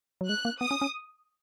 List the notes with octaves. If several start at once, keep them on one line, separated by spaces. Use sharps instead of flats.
F#3
G#3 F#6
A#3
B3 D#6
C#4
C#4